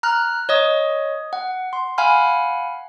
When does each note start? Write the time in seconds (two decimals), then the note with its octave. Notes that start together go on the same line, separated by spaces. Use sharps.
0.03 A#5 F6 F#6
0.49 C#5 D#5 D#6
1.33 F#5
1.73 C6
1.98 F5 F#5 G#5 B5 F6